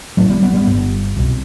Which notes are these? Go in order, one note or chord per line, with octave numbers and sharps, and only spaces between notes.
A1 A2 F#3 A3
G3 B3
G3 B3
G3 B3
G1 G2
C2 B2